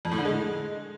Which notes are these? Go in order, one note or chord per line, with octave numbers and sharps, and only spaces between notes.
F2
A2
D3
G#3